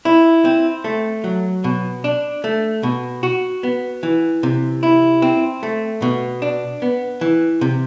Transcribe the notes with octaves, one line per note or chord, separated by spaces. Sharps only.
E4
C4
A3
F#3
B2
D4
A3
B2
F#4
B3
E3
C3
E4
C4
A3
B2
D4
B3
E3
C3